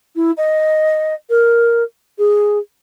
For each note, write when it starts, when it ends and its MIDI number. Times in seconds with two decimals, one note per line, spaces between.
0.16 0.31 64
0.37 1.14 75
1.30 1.83 70
2.18 2.58 68